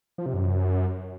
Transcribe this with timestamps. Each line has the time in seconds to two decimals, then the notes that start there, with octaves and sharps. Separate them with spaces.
0.18 F3
0.26 C3
0.33 F#2